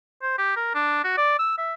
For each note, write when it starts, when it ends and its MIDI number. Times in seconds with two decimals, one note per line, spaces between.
0.22 0.37 72
0.38 0.55 67
0.56 0.74 70
0.74 1.02 62
1.04 1.13 66
1.17 1.37 74
1.39 1.54 88
1.58 1.74 76